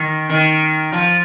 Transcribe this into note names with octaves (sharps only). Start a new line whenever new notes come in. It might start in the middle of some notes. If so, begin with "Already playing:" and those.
Already playing: D#3
D#3
F3